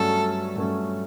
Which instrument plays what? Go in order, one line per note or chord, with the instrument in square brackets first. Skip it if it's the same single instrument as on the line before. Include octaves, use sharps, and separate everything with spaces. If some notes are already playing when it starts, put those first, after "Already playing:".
Already playing: [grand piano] G2 F#3 A3 C#4 [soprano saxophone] A4
[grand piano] G2 F#3 A3 C#4